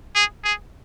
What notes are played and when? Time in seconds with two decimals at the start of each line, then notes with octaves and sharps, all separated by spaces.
0.15 G#4
0.44 G#4